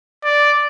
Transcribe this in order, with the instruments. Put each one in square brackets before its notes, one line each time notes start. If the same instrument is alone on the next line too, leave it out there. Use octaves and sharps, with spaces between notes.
[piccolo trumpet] D5